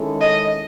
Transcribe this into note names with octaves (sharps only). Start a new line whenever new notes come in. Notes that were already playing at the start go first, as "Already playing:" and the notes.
Already playing: D#3 G#3 C#4 E4 A4
D#5